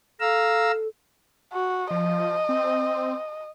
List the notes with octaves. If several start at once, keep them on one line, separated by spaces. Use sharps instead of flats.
A4 F5 A#5 E6
F#4
F3 D#5
C4